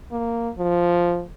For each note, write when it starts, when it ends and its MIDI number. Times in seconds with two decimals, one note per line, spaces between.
0.12 0.50 58
0.59 1.23 53